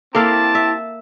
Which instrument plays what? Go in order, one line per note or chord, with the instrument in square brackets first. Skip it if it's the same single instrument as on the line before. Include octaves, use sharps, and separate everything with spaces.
[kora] A#3 A4 F5 [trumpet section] C4 A5 [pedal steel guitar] E4 G4
[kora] E5